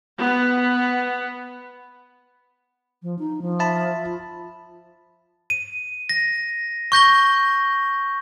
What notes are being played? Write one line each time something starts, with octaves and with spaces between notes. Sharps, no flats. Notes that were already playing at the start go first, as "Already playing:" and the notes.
B3
F3
D#4
F3
E5 A5 B5
F4
D#7
A#6
C#6 G6 A#6 G7